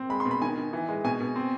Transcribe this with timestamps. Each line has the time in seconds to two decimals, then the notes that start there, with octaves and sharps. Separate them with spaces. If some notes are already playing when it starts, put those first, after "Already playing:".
Already playing: C4
0.09 G#3 B5
0.20 C6
0.25 B2
0.31 B5
0.42 D#3 G#5
0.57 D#3
0.73 E3
0.89 G#3
1.04 B2 G#5
1.20 B2
1.36 C4